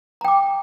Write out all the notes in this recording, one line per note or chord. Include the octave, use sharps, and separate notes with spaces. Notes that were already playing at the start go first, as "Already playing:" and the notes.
G5 A#5 D6